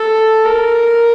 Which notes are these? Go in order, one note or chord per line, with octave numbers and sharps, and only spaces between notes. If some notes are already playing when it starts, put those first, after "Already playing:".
Already playing: A4
A#4